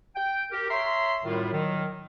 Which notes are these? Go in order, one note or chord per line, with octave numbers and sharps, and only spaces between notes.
G5
G4 A#4
C#5 E5 A#5 C6
F#2 A2 D#3 G3 F4
D#3 F#3